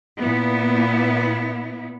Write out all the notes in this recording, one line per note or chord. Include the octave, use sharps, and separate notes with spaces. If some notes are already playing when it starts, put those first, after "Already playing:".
A#2 B3 E4